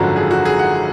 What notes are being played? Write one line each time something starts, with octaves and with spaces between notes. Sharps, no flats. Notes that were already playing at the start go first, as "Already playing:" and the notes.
Already playing: G#1 F#2 D3 F3 F#4
G#4
F#4
G#4
F#5